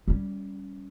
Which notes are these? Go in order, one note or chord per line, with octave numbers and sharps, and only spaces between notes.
G3 C#4